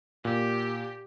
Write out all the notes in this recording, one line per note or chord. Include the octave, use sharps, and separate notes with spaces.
A#2 G4